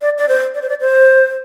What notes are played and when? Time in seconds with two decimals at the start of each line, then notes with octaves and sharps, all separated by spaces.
0.02 D5
0.18 D5
0.28 C5
0.55 D5
0.62 C5
0.69 D5
0.81 C5